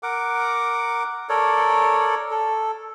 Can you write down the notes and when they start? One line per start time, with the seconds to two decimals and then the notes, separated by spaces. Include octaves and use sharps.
0.03 A#4 F#5 D6
1.29 A4 A#4 C#5 D5
2.31 A4